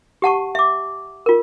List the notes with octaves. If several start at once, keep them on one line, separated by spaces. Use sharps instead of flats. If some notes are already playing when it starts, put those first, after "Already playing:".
G4 F#5 A5 C#6
E5 D6
F4 A#4